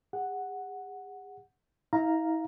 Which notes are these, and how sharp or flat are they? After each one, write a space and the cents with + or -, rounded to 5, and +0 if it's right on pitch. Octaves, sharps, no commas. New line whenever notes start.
G#4 -45 F#5 +0
E4 -40 F5 +0 A#5 +0